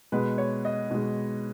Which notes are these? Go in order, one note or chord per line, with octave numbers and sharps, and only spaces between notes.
B2 G#3 B4
C#5
D#5
B2 G#3